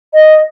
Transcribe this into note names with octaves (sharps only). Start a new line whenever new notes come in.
D#5